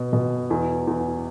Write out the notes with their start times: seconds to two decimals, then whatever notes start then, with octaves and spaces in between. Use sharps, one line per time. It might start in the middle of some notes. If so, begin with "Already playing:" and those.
Already playing: B2
0.13 B2
0.50 E2
0.87 E2